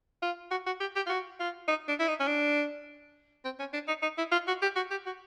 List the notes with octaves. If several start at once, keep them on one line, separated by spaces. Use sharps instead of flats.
F4
F#4
F#4
G4
G4
F4
F#4
F4
D#4
D4
E4
D#4
C#4
D4
C4
C#4
D4
D#4
D#4
E4
F4
F#4
G4
F#4
G4
F#4